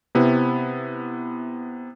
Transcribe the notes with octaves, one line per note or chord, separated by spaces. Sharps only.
C3 B3 E4